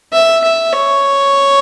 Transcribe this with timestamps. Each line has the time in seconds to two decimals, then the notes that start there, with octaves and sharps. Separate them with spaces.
0.13 E5
0.44 E5
0.73 C#5